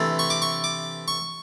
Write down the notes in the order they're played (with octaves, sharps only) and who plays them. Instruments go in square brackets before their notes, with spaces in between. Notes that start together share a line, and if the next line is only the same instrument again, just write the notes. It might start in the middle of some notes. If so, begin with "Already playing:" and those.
Already playing: [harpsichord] C3 E3 A3 D4
C#6
D6
C#6
D6
C#6